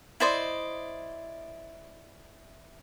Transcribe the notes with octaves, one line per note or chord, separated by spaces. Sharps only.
E4 C5 D5 D#5